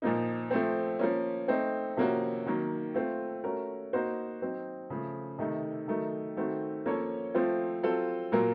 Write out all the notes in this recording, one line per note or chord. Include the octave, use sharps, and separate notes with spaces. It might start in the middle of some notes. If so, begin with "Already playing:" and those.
A#2 F3 A#3 D#4
F3 A3 C4
F3 A#3 C#4
A3 C4 D#4
C3 F3 A#3 C#4 F#4
D#3 F#3 A#3
A3 C4 F4
A3 C#4 F#4 A#4
A#3 D#4 F#4 C5
F#3 C4 D#4
C#3 F3 A3
C3 D#3 A3 D#4
D#3 F#3 A3 D#4 A#4
D#3 A3 C4 F#4
F3 A#3 C#4 A4 C#5
F3 A3 C4 F4
F#3 C4 F4 A4
A#2 F#3 A#3 F4 A#4